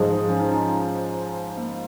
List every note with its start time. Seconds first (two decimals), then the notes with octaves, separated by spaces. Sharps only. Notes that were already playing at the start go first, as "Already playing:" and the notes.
Already playing: G#2 F3 G#3 G#4
0.30 C#4
0.39 D#4
0.48 C#4
1.58 A#3